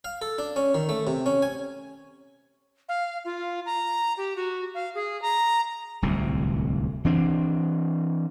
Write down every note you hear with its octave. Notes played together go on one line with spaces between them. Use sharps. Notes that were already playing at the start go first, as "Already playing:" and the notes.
F5
A4
D4
C#4
D#3
A3
C3
C#4
G#5
F5
F4
A#5
G4
F#4
F5
G#4
A#5
D1 C2 C3
E3 C4 D4